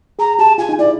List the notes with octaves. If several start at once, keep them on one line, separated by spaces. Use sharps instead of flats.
G#4 A#5
G4 A5
F4 G#5
D#4
E4 D5